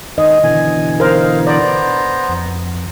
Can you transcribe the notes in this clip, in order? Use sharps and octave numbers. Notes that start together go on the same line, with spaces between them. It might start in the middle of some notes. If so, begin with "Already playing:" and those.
D#3 G#3 G#4 D#5
B2 D3 E3 G#5
D#4 A#4 C5 F5
B3 C5 D5 A#5
F2